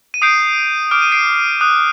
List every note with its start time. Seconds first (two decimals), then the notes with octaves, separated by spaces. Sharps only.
0.14 D#7
0.22 D#6 G6 C7 D7
0.91 D6 F6 D7
1.02 D#7
1.12 C7 D7
1.61 D#6 F#6